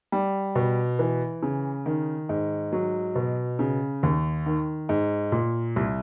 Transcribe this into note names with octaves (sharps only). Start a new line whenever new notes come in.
G3
B2
E3
C#3
D#3
G#2
F#3
B2
C#3
D#2
D#3
G#2
A#2
C2